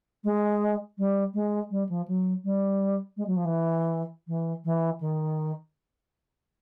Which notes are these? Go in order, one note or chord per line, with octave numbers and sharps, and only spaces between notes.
G#3
G3
G#3
G3
F3
F#3
G3
G#3
F#3
F3
E3
E3
E3
D#3